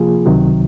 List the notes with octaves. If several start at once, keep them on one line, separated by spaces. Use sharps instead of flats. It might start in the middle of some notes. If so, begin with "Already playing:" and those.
Already playing: C3 F3 A#3 F4 G#4
C#2 C3 D#3 F#3